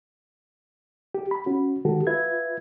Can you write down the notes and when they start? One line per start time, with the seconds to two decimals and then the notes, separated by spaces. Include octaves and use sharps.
1.15 G4
1.31 B5
1.46 C#4 F#4
1.85 D#3 G#3 F#4 G4 A4
2.07 F4 B4 E5 G#6